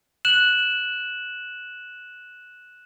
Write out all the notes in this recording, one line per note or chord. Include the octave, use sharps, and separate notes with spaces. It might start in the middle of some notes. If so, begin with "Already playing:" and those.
F#6 E7 F#7